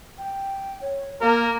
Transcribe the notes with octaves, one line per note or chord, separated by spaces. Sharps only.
G5
C#5
A#3 A#4 F5